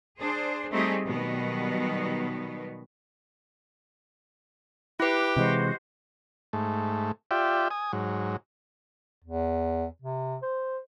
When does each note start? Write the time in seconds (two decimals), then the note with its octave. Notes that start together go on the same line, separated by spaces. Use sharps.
0.20 D4 G#4 C5
0.71 G3 A3 C4 D#4 G4 G#4
1.03 B2 D#3 F#3 G3 B3
5.00 E4 G4 B4 D6
5.36 C3 E3 G#3 F#4 C5 D#5
6.53 G#2 A3
7.31 F4 G4 D5 E5 G5
7.71 G#5 D#6
7.93 G#2 F#3
9.24 E2
10.02 C3
10.42 C5